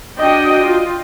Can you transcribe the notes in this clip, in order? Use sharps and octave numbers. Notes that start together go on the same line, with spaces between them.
D4 F#4 D#5 G5
F4